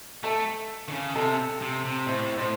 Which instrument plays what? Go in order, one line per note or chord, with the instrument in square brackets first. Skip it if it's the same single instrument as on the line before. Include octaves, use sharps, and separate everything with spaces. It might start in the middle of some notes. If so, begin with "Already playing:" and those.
[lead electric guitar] A3 [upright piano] A4
[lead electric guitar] D#3
C#3
[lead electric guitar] C3 [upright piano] A4
[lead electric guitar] C3
C3
[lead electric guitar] A2 [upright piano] C5
[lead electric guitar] A2 [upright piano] C5